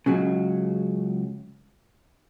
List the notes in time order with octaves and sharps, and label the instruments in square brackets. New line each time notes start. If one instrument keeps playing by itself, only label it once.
[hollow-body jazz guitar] C#2 C#3 F#3